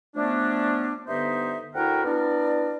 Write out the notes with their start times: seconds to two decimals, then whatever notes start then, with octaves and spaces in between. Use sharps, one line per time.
0.15 F3 A3 B3 C#4 D4
1.08 G2 D3 B3 D#4 C5 E5
1.75 D2 E4 F#4 A#4 F#5 G5
2.05 B3 D4 E4 A#4 D5